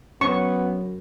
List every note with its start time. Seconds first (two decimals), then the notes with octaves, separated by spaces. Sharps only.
0.21 F#2 B3 C#4 C#6